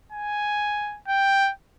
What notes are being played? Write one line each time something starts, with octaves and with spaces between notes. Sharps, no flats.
G#5
G5